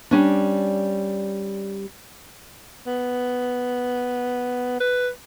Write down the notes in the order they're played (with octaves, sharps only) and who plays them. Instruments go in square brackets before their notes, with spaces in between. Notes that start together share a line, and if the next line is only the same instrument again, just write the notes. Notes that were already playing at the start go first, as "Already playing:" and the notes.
[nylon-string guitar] G3 C#4 D4
[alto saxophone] B3
B4